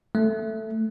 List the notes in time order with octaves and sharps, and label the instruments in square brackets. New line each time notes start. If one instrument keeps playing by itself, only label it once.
[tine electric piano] A3